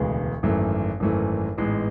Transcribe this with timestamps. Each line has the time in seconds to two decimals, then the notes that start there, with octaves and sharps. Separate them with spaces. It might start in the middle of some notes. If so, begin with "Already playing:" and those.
Already playing: E1 D2 C#3 G#3 B3
0.43 G#1 F#2 E3 A3
1.00 G#1 F#2 E3 A3
1.58 A1 G#2 G#3 B3